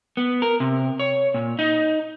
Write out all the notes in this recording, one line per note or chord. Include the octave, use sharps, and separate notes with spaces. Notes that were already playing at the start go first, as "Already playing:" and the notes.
B3
A#4
C3
C#5
A#2
D#4